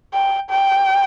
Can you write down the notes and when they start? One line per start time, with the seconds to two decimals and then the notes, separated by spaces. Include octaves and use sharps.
0.14 G5
0.50 G5